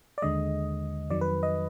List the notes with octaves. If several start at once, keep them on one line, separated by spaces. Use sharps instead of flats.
D5
D#2 D3 G#3 D#5
F2 D#3 F#3 D5
B4
D#5